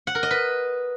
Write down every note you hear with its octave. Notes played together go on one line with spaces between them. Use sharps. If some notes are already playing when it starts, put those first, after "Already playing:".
F#5
A#4
D#5
B4